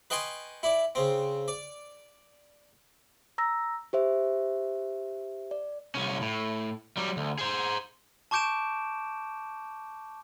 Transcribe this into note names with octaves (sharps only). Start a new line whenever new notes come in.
B4 D#5 G5 G#5 C6 C#6
E4 D5
C#3 C4
D5
A#5 E6 A#6
G4 C5 E5
D5
C2 C#4
A2
F#3 G3
D2
G#4 C5
A5 C#6 D6 G6 D7 E7